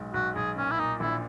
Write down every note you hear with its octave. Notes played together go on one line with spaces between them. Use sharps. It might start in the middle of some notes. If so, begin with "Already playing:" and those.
Already playing: B1 G#3
B1 F#4
B1 G#4
A#2 C#4
E4
A#2 D#4
A#1 E4